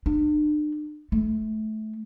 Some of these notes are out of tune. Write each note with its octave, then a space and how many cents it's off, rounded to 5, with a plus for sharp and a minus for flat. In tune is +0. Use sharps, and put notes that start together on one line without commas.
D4 +40
A3 -20